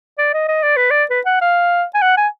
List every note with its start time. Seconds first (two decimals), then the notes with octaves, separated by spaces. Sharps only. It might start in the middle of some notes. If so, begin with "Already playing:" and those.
0.18 D5
0.34 D#5
0.48 D#5
0.63 D5
0.76 B4
0.91 D5
1.10 B4
1.26 F#5
1.41 F5
1.94 G#5
2.02 F#5
2.17 G#5